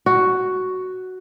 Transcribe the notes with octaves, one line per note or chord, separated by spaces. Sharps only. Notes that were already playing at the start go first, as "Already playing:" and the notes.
F#4